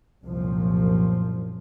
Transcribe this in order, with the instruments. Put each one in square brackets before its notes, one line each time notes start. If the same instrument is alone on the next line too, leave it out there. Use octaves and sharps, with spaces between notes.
[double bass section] C2 F#2 A#2 F3